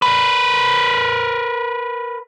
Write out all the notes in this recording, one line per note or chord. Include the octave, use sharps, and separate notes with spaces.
A#4 B4